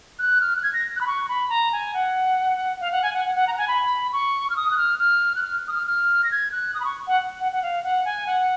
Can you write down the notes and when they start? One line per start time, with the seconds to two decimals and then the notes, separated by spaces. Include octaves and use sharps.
0.19 F#6
0.41 F6
0.56 F#6
0.63 G#6
0.74 A#6
0.96 F#6
1.01 B5
1.07 C#6
1.29 B5
1.50 A#5
1.72 G#5
1.94 F#5
2.81 F5
2.92 F#5
3.02 G#5
3.14 F#5
3.25 F#5
3.35 F#5
3.47 A#5
3.53 F#5
3.58 G#5
3.68 B5
4.13 C#6
4.50 F6
4.56 D#6
4.71 F#6
4.77 F6
4.99 F6
5.36 F#6
5.43 F6
5.68 D#6
5.73 F6
5.87 F6
6.24 A#6
6.31 G#6
6.52 F#6
6.74 D#6
6.80 B5
6.85 C#6
7.07 F#5
7.40 F#5
7.52 F#5
7.62 F5
7.84 F#5
8.05 G#5
8.27 F#5